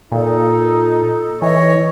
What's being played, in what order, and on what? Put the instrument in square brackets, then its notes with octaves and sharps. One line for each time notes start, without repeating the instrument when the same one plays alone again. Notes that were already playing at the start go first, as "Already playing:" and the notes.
[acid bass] A#2 [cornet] D#4 [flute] A4
[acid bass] E3 [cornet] C#5 [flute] D#5